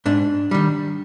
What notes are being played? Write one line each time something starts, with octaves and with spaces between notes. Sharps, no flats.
G#2 D4
D#3 G3